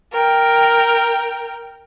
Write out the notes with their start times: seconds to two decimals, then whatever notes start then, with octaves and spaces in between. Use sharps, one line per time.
0.12 A#4 G5